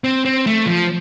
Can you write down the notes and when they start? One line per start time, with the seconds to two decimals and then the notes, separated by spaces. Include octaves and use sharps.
0.04 C4
0.25 C4
0.47 A3
0.67 F3